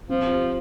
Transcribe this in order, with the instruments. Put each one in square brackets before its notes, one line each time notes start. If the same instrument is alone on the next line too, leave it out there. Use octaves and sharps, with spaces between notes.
[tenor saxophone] F3 [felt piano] C4
[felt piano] G4